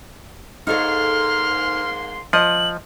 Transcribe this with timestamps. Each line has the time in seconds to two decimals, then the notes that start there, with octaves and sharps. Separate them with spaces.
0.67 G#2 A#3 D#4 A4 C#5 C6 F6
2.33 F3 D#5 F#7